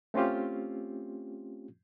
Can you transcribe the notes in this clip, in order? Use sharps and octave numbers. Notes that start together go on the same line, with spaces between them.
A3 C4 C#4 F4 G4